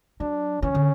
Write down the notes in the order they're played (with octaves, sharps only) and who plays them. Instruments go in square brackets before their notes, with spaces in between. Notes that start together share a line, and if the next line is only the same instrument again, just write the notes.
[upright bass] F#3 [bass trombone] D4
[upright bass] E3 [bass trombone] C#4
[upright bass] D3